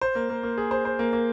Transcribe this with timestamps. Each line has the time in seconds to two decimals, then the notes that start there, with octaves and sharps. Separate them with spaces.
0.01 C5
0.15 A#3
0.30 A#3
0.43 A#3
0.58 G#4
0.71 C5
0.85 C5
0.99 A#3
1.13 A#3